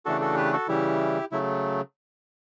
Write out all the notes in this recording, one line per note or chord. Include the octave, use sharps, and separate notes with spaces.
C#3 E3 A3 D4 F#4 A4
F#4 A4
G4 B4
F#4 A4
C#3 E3 G3 E4 G4
C#3 F#3 A3 E4